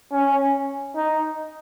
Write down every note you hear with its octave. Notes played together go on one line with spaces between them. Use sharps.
C#4
D#4